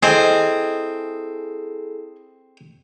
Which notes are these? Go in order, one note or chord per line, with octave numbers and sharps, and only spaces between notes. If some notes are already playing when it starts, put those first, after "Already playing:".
C4 E4 G#4 A4 D#5 G#5